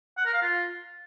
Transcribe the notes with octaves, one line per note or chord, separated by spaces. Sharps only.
F#5
A#4
F5
F4